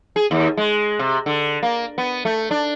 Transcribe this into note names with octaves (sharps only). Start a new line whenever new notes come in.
G#4
D#2
G#3
C3
D3
A#3
B3
A3
D4